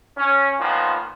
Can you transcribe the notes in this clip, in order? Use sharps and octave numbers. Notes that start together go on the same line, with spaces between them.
C#4
A#2 D#3 F3 B3